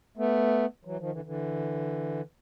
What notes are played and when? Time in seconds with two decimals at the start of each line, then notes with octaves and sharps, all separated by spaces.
0.17 A3 B3
0.85 E3 F#3
0.99 D#3 F3
1.12 D3 E3
1.25 D3 E3